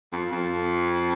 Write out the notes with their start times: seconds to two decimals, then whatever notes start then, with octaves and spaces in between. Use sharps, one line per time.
0.12 F2
0.32 F2